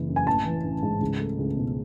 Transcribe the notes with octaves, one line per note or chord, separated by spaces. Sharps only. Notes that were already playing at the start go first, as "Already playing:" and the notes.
Already playing: F#1 E3
F#2
G#5
A1 A5
E3
A1
G#2
C#2
A3
C#2
B2